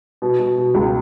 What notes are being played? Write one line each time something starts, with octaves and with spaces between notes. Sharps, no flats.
B2
B2
B2
C#2